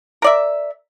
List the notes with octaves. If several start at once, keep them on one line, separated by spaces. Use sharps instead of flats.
A#4 D5 E5